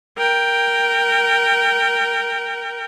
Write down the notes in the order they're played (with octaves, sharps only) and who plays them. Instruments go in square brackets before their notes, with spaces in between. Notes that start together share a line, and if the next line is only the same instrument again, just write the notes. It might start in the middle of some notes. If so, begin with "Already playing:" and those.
[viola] A#4 G5